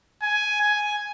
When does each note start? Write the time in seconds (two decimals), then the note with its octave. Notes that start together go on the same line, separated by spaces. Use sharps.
0.22 G#5
0.61 G#5